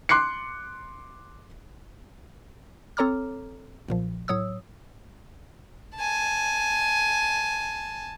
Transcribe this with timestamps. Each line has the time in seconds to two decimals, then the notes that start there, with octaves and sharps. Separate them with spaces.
0.09 C6 D6 F#6 C7 C#7
2.97 C4 A4 C#5 A#5 D6 F6
3.88 B1 A#2 F3
4.28 A2 F#3 C#5 D#6 E6
5.96 G#5 A5